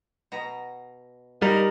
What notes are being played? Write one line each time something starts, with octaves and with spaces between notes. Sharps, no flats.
B2 A#5
G3 D#4 A#4